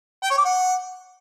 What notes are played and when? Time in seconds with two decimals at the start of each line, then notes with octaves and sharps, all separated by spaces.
0.23 G5
0.30 C#5
0.38 D6
0.45 F#5